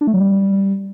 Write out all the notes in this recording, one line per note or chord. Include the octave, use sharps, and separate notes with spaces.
D4
A3
F#3
G3